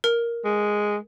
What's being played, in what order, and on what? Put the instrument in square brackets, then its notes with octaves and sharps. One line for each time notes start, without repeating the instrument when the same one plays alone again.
[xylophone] A#4
[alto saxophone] G#3